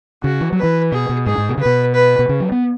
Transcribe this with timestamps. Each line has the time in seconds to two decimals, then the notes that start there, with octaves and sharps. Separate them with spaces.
0.23 C#3 F#4
0.41 E3
0.52 F#3
0.58 B4
0.63 E3
0.92 B2 G#4
1.09 B2
1.26 G#2 G#4
1.38 G#2
1.49 B2
1.57 C#3 B4
1.66 B2
1.94 B4
2.19 B2
2.29 C#3
2.40 F#3
2.52 B3